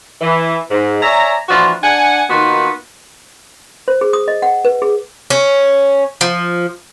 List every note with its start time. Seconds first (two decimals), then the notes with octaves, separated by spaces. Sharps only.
0.21 E3
0.70 G#2
1.02 C#5 D5 E5 G#5 A#5
1.49 A#2 E3 F3 D4 F4 F#4
1.82 D4 F#5 G#5
2.30 D#3 A#3 B3 D#4 F4 F#4
3.88 C5
4.01 G#4
4.13 D#6
4.28 D#5
4.42 F#5
4.65 B4
4.82 G#4
5.30 C#4
6.21 F3